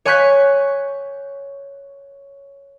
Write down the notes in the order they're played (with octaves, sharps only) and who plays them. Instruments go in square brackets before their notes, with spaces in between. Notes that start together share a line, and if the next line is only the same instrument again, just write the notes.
[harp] C#5 G#5 C#6 F#6 G6 B6